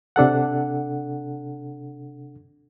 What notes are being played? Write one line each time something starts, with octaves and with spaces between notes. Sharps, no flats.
C3 D4 A4 F#5